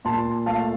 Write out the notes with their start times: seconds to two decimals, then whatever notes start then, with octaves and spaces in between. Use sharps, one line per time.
0.05 A#2 A5 C6
0.46 A3 F5 A5